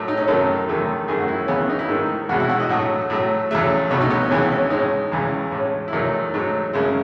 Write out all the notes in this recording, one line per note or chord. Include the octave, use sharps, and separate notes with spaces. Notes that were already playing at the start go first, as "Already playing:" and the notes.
Already playing: A2 F#3 A3
D#4
C#4
F#2 D#3 F#3 A3 A4
E2 D#3 A3
F#2 D#3 A3 G#4
F#4
E4
C#4
D#2 C#3 E3 B3
D#4
E4
G#2 D#3 A3
E2 B2 G#3 F#4
E4
F#4
D#5
A2 F#3 A3 F#5
A2 F#3 A3
E2 C#3 F#3 A3 E5
C#2 B2 F#3 A3 C#5
D#4
B3
C#4
D#2 C#3 E3 G#3 B3
B3
C#4
C#4
A2 G#3 D#4
C#4
E2 C#3 E3 G#3
A2 G#3 C#4
E4
E2 D#3 F#3 A3 D#4
G#2 F#3 A3
F#2 C#3 G#3